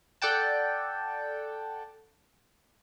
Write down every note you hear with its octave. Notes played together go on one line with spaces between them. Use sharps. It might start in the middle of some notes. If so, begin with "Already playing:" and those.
A4 D5 F#5 G5 A5